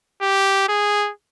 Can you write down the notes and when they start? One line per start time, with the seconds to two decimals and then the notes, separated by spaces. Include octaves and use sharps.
0.22 G4
0.68 G#4